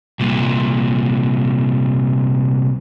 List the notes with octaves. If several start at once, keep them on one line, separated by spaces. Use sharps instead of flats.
C2 A#2